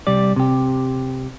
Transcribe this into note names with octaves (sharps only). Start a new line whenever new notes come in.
C2 G3 D5
C3 G4